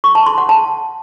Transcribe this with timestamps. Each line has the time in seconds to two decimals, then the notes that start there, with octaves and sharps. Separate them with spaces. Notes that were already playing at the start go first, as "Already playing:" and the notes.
0.04 C#6
0.15 A5
0.26 C6
0.38 F#5
0.49 A5